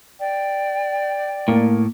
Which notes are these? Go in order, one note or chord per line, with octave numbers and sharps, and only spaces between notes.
D5 G5
A2 A#3